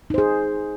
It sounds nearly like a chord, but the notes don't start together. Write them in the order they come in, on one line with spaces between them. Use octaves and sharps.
D#4 C5 G#4